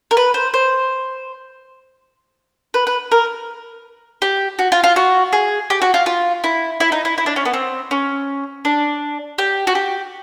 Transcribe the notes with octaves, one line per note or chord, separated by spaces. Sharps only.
A#4
B4
C5
C5
B4
B4
A#4
G4
F#4
F4
F4
F#4
G#4
G4
F#4
F4
F4
E4
E4
D#4
E4
E4
D4
C#4
B3
C4
C#4
D4
G4
F#4
G4